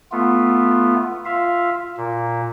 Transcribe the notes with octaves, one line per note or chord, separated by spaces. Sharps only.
A3 B3 F4
F4 E5 F5
A#2